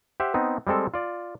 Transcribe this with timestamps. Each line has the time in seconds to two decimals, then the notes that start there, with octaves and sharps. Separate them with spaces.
0.20 G4 C5 E5 F#5
0.34 B3 C4 D#4
0.67 G3 G#3 C4 A4
0.94 F4 D5